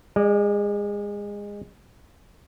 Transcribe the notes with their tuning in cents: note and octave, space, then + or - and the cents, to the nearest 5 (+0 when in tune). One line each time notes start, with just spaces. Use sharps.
G#3 -25 D5 +20